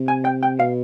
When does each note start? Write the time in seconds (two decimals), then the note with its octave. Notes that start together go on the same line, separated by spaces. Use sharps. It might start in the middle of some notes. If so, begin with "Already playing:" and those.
Already playing: C3
0.08 G#5
0.25 G5
0.43 G5
0.59 B2 F5